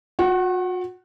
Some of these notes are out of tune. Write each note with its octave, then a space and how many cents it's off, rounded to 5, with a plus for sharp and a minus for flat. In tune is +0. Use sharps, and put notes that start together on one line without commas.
F#4 -40 F#5 +20